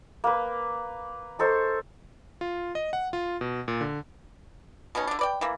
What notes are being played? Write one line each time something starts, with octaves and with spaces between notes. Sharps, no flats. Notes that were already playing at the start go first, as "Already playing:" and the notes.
A#3 B4
D#4 A4 C5 C#6
F4
D#5
F#5
F4
B2
A#2
D3
B2 B3 C#4 D#4
D3 D4
B4 D5 G5
E3 A#3